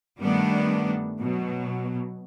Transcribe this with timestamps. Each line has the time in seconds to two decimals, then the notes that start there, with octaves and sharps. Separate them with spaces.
0.20 G2 D#3 G3 A3 B3 D4
1.19 B2 F#3